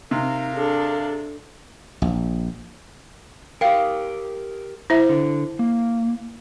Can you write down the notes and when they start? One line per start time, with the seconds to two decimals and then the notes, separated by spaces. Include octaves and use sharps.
0.11 C3 D#4 A#4 F5
0.55 D4 G#4 A4
2.02 A#1
3.61 G4 A#4 F5 G5
4.90 E4 C5 E5
5.09 D3
5.59 A#3